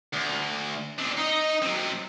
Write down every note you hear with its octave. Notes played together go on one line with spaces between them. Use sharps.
D2
C4 D4
D#4 D#5
F#3 C4